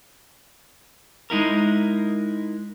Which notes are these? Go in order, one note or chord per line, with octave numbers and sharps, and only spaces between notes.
G#3 D#4 E4 A#4